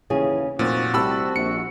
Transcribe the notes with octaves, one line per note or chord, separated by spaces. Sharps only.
D#2 C#3 E3 G#4
F1 A#2 F3 F#4
C2 C4 G4 A5 B5 E6
A#1 C#7